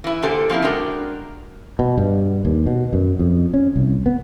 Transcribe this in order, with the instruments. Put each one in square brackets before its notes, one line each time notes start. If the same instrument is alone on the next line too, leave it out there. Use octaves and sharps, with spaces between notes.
[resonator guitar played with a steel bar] E3 E4
A#2 D3 G4 A4 C5
F3 A#3 C4 E4
G#3 D4 F#4 A#4 G5
[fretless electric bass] B2
G2
D#2
B2
F#2
F2
C#4
C2
B3